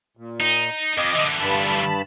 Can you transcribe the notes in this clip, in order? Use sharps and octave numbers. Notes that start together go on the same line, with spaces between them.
A#2
D#4
F2 D#5 D6 D#6
D3 E3
G2 A5 B5